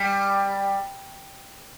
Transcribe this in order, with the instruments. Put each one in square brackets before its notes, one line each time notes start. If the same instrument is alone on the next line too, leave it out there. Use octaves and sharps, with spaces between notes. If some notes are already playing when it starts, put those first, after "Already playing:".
Already playing: [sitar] G3